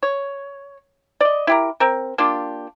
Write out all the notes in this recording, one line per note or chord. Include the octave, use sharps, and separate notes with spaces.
C#5
D5 D#5
E4 G4 A#4
C4 A#4
A#3 D4 F4 G4